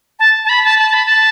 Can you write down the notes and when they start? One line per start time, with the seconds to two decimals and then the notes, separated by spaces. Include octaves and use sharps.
0.19 A5
0.45 A5
0.49 B5
0.64 A5
0.79 A5
0.93 B5
1.06 A5